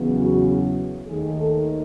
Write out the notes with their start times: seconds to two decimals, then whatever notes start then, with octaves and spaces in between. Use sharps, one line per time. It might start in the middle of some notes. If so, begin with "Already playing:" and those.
Already playing: E2 C#3 F#3 B3
0.15 F#4
1.07 D#2 D#3 A3 G#4
1.38 A4